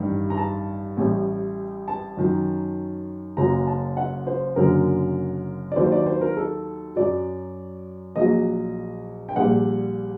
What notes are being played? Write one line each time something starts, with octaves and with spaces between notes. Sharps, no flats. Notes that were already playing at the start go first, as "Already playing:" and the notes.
Already playing: A1 G2 D#3 G3
A#5
A5
A1 A2 G3
A5
F#2 D#3 F#3
F#1 F#2 F#3 A#5
A5
F#5
C5
F#1 F#2 D3 F#3 A#4
D5
D#2 D#3 F#3 C5
D5
C5
A#4
A4
F#2 F#3 D5
A#1 A#2 F#3 D#5
G5
A#1 A#2 G3 F#5